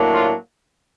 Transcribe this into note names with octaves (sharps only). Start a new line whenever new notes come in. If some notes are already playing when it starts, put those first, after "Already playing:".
Already playing: A2 F#3 A#3 D4
F4